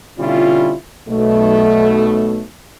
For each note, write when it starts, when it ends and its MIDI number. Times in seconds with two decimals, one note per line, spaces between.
0.19 0.73 47
0.19 0.73 50
0.19 0.73 55
0.19 0.73 61
0.19 0.73 64
0.19 0.73 65
1.09 2.42 35
1.09 2.42 47
1.09 2.42 57